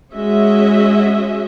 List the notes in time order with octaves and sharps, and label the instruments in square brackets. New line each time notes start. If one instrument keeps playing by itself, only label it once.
[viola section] G#3 C#4 F#4 D#5 E5